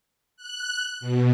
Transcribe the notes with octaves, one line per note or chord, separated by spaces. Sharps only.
F#6
B2